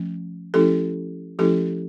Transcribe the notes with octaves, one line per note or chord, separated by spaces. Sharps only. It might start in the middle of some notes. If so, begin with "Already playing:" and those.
Already playing: F3 A3 C#4
F3 A3 C#4 E4 G4 A4
F3 A3 C#4 E4 G4 A4